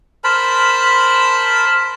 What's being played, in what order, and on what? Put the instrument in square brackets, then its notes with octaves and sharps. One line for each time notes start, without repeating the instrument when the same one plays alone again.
[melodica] A#4 C5 A5 B5